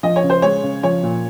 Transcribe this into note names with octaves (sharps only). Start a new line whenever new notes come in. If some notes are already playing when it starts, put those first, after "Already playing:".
F3 D#5
C#5
C#3
C5
G#3 C#5
C#3
F3 C#5
A#2